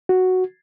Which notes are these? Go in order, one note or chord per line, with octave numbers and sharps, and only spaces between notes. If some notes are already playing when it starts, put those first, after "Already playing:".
F#4